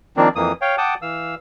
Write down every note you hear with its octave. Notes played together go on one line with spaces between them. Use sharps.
D#3 F3 A#3 C4 D4
F2 E3 A#3 D#6
C#5 F5 G5
F#5 G5 A5 D6 D#6
E3 F5 E6